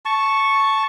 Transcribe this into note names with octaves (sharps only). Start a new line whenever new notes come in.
A5 C#6